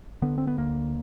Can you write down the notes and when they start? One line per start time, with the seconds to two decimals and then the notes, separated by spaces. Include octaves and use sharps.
0.22 D3 B3
0.38 C4
0.47 B3
0.58 D2 A#3